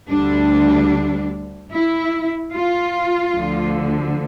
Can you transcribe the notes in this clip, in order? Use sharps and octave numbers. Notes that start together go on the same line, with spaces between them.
D2 D3 G3 D4
E4
F4
D2 D3 F3